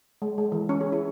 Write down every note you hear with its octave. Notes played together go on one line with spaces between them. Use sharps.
G#3
G#3
E3
C#4
G#4
E4